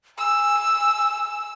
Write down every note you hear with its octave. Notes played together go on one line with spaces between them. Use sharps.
G#5 E6